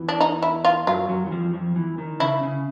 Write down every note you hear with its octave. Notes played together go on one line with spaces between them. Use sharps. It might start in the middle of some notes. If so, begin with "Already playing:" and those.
Already playing: E2 E3
D4
D#4
E4
F4
F#2 F#3 F4
F#2 F#3
E3
F2 F3
F2 F3
E2 E3
D#3
C#3 E4
C#3